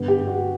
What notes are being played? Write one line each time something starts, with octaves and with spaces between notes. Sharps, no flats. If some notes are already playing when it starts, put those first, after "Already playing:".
Already playing: G2 D3 G3 B3
G4
F#4